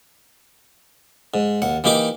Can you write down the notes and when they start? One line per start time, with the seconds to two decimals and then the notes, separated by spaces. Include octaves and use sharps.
1.34 G#2
1.62 D#2 F#5
1.84 E3 A#3 D#4 G4 D6